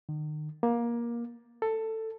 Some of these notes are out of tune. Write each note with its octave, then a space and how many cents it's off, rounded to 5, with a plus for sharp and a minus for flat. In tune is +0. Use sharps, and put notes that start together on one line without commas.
D#3 -40
A#3 +20
A4 +15